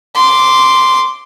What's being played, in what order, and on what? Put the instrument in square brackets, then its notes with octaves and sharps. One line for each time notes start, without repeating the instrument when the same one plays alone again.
[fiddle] C6 D6